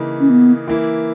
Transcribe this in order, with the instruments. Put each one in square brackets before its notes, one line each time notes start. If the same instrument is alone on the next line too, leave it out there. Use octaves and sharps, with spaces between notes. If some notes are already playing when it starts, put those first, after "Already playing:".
Already playing: [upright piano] C#3 E3 A#3 D#4
[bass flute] C#4
B3
[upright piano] E3 A#3 E4